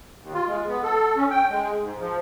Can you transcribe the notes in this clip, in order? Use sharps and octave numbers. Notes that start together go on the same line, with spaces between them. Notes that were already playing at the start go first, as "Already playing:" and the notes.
D#2
F4
G#3
B3
A4
C#4
G5
G#3
G#2
F3